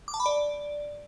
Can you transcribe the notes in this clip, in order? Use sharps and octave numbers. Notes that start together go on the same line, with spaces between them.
D6
A5
B5
D5